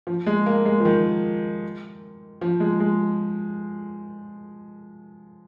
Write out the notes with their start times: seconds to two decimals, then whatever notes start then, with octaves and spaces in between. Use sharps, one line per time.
0.07 F3
0.26 G#3
0.46 A#3
0.65 G#3
0.80 F3
0.85 D#3
2.41 F3
2.60 G#3
2.80 G#3